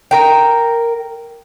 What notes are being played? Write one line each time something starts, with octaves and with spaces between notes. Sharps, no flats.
A#4 G5